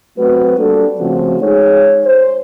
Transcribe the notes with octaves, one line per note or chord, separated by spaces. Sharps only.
F#3 A3 C4 F#4 B4
G3 A#3 D4 A4
C#3 F3 A3 C4 F4 F#4
G#3 D#4 G#4 C#5
C5